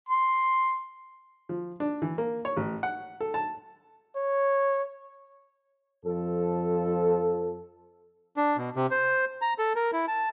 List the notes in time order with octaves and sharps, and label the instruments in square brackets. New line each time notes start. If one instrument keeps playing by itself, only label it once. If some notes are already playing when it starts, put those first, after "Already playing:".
[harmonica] C6
[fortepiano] F3
D4
E3
A#3
C#5
A1
F#5
A4
A5
[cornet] C#5
[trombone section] F2 F3 A4
[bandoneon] D4
B2
C3
C5
A#5
A4
A#4
E4
A5